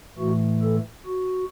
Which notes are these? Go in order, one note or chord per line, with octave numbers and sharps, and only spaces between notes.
A2 E3 A3 F#4
A4
F#4